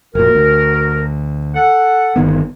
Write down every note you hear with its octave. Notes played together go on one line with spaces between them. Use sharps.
F1 A#2 F#4 A#4
D2
A4 F#5
G1 D#3 B3